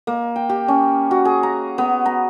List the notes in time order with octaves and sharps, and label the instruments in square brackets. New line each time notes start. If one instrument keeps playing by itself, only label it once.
[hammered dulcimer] A#3
G5
G4
C#4
F#4
G#4
A#5
B3
A#5